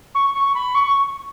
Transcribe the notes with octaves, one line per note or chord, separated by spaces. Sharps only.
C#6
C#6
B5
C#6